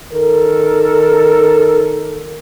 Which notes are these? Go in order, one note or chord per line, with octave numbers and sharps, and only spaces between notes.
D#3 A4 A#4